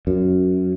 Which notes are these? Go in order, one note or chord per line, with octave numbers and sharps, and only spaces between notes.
F#2